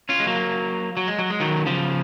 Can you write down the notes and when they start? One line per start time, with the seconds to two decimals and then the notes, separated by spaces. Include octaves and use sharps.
0.09 C#4 F4
0.20 G#3
0.27 F#3 A#3
0.97 F#3
1.08 G#3
1.19 F#3
1.30 G#3
1.40 D#3 F#3
1.66 C#3 F3